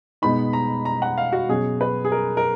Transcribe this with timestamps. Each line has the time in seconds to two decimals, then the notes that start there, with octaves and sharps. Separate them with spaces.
0.22 B2 G#3 B3 D#4 B5
0.53 A#5
0.85 A#5
1.02 F#5
1.18 F5
1.32 F#4
1.49 B2 F#3 C#4 G#4
1.81 B4
2.05 G#4
2.12 A#4
2.37 A#4